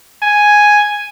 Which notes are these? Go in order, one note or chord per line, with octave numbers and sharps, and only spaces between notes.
G#5